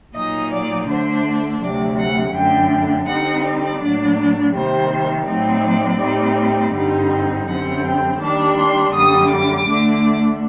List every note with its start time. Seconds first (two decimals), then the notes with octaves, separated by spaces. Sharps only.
0.15 A#2 F#3 A#3 D#4 D#5
0.51 D5
0.89 D3 A3 D4 C5
1.61 D2 C3 F#3 D5
1.98 F#5
2.34 F#2 D3 A3 D4 G5
3.07 D3 G3 C4 D#4 F#5
3.44 D5
3.81 A2 F#3 A#3 D4
4.54 C3 D#3 G3 A#3 C5
5.26 A2 F#3 A3 C4 D#4 D5
6.00 A2 G3 C4 D#4
6.73 G2 D3 G3 C4 D#4
7.47 F#2 D3 G3 C4 F#5
7.83 G5
8.19 D#2 D#3 G3 D4 A5
8.57 C6
8.93 F#2 D3 G3 A#3 D#6
9.30 D6
9.67 D2 D3 A3 D4